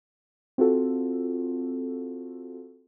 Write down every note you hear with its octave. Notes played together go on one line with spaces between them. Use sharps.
C4 F4 F#4 A4